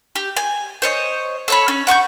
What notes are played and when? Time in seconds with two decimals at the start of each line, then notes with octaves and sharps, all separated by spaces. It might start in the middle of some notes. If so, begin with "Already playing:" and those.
0.16 G4
0.37 G#5
0.82 C5 C#5 D#5
1.48 A4 C#5 B5
1.68 C#4
1.87 F#5 C#6 D6 G6